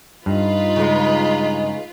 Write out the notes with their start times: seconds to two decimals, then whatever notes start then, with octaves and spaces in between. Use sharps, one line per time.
0.26 G2 D#4 F4 B4
0.76 C#3 G#3